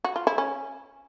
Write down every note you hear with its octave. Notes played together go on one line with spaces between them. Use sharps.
F#4
F4
E4
C#4